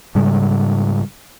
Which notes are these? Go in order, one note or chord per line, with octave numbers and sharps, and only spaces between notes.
G#2 C#3 G3 G#3